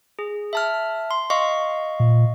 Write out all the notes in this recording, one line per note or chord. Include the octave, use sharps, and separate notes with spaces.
G#4
E5 A5 F6
C6
D#5 F5 C#6
A#2